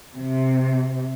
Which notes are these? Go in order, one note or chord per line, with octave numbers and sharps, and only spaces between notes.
C3